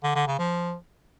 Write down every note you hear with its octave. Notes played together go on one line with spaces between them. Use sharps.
D3
D3
C#3
F3